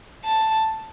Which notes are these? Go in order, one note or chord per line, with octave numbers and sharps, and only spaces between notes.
A5